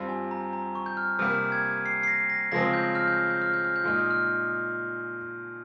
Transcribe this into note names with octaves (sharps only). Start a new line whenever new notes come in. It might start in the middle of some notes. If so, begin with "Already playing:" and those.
Already playing: G2 G3 C4 F4
G#5
A#5
A#5
C#6
G6
F6
C3 G3 A#3 F6
G#6
C7
C7
A#6
A#6
C#3 F3 G#3 C4 A#6
G6
F6
G6
F6
G6
F6
G6
F6
G6
A#2 G#3 D#4 F6
G6
F6